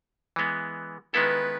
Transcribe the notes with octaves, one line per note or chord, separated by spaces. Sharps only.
E3 G#3 B3
D#3 G#3 B3 E4 A4 B4